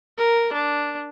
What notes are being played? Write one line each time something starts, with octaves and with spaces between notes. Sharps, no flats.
A#4
D4